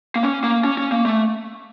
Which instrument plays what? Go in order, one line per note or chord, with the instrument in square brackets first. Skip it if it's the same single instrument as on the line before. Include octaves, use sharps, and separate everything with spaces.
[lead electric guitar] A#3
C#4
A#3
C#4
C#4
A#3
A3